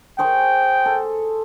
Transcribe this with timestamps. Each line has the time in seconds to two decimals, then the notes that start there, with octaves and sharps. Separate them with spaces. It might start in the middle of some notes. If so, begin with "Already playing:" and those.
0.19 G#4 C5 G5 C#6
0.86 A4